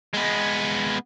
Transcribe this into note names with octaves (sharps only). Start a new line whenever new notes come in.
G#3 B3